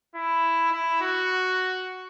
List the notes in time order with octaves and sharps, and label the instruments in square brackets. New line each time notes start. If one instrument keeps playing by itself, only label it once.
[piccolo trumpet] E4
E4
F#4